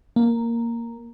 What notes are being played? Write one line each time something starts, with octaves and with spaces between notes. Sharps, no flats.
A#3